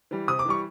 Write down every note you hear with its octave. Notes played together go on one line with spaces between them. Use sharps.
E3 G3
C3 D#6
D6
E3 G3 C#6